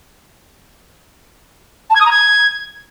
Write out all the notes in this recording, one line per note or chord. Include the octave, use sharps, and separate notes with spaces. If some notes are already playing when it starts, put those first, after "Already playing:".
A5
G#6
D#6
A#5
G#6